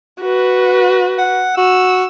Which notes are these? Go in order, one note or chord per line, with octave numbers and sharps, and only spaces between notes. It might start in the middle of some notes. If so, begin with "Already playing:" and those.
F#4 B4
F#5
F#4 E6